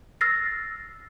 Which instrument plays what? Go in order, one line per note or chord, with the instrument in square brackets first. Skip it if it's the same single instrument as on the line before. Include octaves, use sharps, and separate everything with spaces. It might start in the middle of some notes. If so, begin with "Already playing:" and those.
[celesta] E6 F6 A6 A#6 C7